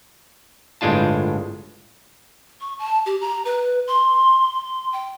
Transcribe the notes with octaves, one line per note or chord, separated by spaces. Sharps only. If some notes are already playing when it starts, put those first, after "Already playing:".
G1 A2 G#3 D4 F4 A5
C#6
A5
G4
A#5
B4
C6
G5